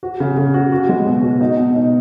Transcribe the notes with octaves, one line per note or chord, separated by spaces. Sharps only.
F#4
C#3
C#3
F#4
F#4
G#3
B2
F#4
D#4
B2
D#4